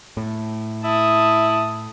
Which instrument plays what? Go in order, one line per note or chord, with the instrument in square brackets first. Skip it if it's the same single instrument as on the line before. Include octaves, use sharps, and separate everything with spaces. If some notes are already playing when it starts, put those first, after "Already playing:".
[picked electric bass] A2
[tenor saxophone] E4 [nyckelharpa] A5 D#6